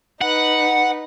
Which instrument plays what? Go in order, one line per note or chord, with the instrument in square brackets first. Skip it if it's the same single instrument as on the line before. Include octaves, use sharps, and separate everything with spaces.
[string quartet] D#4 B4 [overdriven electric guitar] F#5